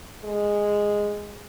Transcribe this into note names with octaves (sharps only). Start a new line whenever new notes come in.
G#3